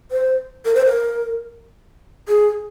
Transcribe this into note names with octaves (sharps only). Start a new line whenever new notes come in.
C5
A#4
C5
A#4
G#4